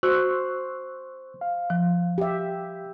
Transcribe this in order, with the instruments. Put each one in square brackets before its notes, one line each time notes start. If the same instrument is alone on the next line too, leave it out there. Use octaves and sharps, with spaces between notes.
[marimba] F#4 [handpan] C5 [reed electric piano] C#6 E6 F#6
[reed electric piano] F5
[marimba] F3
[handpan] G4 E5